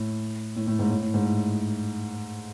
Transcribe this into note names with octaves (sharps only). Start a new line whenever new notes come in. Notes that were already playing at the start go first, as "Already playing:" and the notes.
Already playing: A2
A2
A2
G#2
A2
A2
G#2
A2